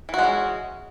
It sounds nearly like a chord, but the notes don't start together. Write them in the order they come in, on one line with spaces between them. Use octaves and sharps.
E3 F#4 G#3 C#4